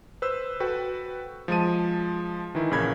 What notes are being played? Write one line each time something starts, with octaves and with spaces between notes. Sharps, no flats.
B4 C5 E6
F#4 A4 B4 G5
F3 G#3 A5 D#7
D#3 E3 E4
A#1 C#3 A#4 B5 G#6